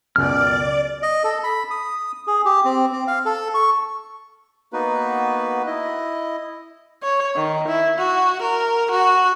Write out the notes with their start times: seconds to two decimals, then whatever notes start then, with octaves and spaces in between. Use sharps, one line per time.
0.16 C#2 F#2 B2 D5 F6
1.03 D#5
1.24 A4
1.44 B5
1.71 D#6
2.27 G#4
2.45 G4
2.65 C4
2.92 C4
3.07 F5
3.25 A4
3.54 C#6
4.73 A#3 B3 D#4 F#4 B4
5.66 E4 D#5
7.03 C#5
7.35 D#3
7.68 E4
7.98 F#4
8.42 A#4
8.91 F#4